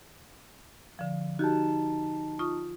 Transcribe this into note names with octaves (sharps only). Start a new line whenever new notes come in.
D3 F3
D#4 F#4 G4 A5
F4 C#6 D#6